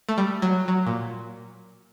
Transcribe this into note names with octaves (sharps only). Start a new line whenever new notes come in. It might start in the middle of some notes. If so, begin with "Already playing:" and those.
A3
G3
F#3
F#3
A#2